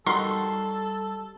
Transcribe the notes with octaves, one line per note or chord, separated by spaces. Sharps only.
G3 D#4 F#4 A4 A#4 C6